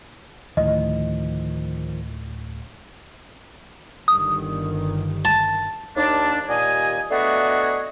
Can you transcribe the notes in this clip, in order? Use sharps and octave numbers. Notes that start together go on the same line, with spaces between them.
D2 A2 D#3 F3 D#5
G1 G2 D#3 D#6
A5
D#2 D4
D#2 A#2 G3 D#5 G#5
A3 B3 D4 F#4 G#4 D#5